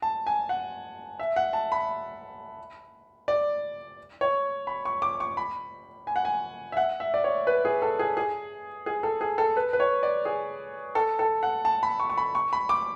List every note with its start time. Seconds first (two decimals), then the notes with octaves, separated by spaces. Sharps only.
0.02 A5
0.27 G#5
0.49 F#5
1.19 E5
1.36 F#5
1.53 A5
1.72 B5
3.28 D5
4.21 C#5
4.67 B5
4.85 C#6
5.02 D6
5.20 C#6
5.37 B5
6.07 G#5
6.16 F#5
6.25 G#5
6.72 E5
6.77 F#5
7.00 E5
7.14 D5
7.24 C#5
7.47 B4
7.65 G#4
7.82 A4
7.99 G#4
8.17 G#4
8.86 G#4
9.03 A4
9.21 G#4
9.38 A4
9.56 B4
9.73 B4
9.80 C#5
10.03 D5
10.25 G#4
10.95 A4
11.19 A4
11.43 F#5
11.65 A5
11.83 B5
12.00 C#6
12.10 C#6
12.18 B5
12.35 C#6
12.53 B5
12.69 D6